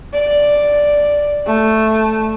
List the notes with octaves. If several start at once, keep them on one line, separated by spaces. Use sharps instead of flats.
D5
A3